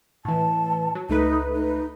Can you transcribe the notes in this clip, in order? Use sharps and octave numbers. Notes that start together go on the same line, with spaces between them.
A2 E3 A5
F#3
C#2 A3 D#4 B4
D#4